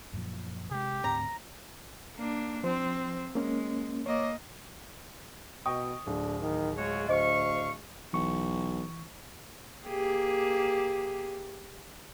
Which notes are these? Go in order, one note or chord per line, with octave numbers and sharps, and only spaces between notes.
F#2 A#2 F3
C3 G#3 G4
D2 G#2 C4 A#5
A#3 D4
F3 C4 C5
G#3 A#3 C#4
A#3 C#5 D#5 D6
B2 D#5 G5 C#6 D#6
D1 D3
D#3
G#3 F4 F#4 C#5
D2 C5 D#5 F5 C#6
B1 E3 C#6
A#3 G4 G#4